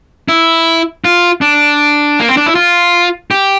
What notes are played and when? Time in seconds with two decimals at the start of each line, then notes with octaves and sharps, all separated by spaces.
0.29 E4
1.05 F4
1.41 D4
2.20 A#3
2.29 C4
2.37 D4
2.46 E4
2.55 F4
3.31 G4